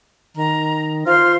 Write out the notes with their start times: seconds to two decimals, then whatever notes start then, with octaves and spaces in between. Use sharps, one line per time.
0.37 D#3 A#5
1.06 F4 C5 C6 F6